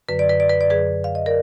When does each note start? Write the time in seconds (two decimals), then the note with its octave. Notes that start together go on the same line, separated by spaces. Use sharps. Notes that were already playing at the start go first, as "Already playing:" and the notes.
0.09 F#2 D3 F#3 B4
0.19 D5
0.29 B4
0.40 D5
0.50 B4
0.61 D5
0.67 F#2 D3 F#3 G#4 B4
1.04 F5
1.15 D#5
1.26 A#4 D5